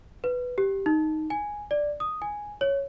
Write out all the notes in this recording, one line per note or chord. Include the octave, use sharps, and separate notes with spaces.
B4
G4
D#4
G#5
D5
D#6
G#5
C#5